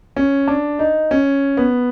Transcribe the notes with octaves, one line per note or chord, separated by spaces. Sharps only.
C#4
D4
D#4
C#4
B3